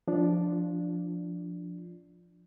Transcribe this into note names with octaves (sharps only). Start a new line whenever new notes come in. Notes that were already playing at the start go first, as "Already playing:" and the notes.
F3 D4 F4